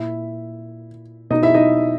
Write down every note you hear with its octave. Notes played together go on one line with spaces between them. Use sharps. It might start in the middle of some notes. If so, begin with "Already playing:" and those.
Already playing: A#2 E4 E5
B2 D#4 D#5
E4 E5
D#4 D#5